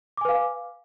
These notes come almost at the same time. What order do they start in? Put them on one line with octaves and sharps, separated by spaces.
D6 G#5 B4 F5